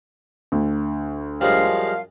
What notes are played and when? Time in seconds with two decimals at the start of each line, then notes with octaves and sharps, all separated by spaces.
0.52 D2
1.41 F#2 F3 G3 G#3 F5